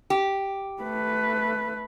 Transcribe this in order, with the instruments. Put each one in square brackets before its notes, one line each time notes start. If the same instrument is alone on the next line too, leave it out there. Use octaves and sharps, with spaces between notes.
[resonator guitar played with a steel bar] G4
[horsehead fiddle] A3 B4